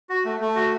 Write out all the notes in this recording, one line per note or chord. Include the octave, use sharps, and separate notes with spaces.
F#4
A3
A3
F#4